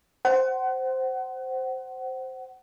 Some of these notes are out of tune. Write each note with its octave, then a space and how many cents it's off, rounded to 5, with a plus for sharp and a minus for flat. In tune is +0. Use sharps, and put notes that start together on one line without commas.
C5 +0 F#5 +30